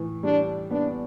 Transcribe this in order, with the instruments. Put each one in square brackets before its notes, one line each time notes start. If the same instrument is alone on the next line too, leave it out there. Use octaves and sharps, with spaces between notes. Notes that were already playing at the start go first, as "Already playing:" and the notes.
Already playing: [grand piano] A2 E3
[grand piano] G3 [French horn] D4
[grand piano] B3 [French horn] D4